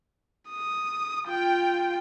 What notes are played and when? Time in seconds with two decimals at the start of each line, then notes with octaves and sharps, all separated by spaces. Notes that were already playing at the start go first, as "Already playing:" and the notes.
0.50 D#6
1.28 F4 G5